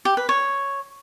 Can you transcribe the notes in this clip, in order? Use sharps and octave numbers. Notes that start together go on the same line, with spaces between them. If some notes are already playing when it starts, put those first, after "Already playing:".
G4
B4
C#5